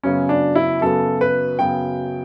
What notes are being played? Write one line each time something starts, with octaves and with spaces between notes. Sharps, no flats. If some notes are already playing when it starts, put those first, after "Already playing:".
F#2 C#3 F#3 B3 C#4
D4
E4
F#2 C#3 F#3 B3 A4
B4
F#2 C#3 F#3 B3 G5